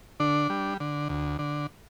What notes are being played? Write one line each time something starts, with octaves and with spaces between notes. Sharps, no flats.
D3 D4
G3
D3
D2
D3